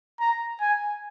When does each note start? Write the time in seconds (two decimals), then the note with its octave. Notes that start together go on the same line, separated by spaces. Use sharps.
0.20 A#5
0.61 G#5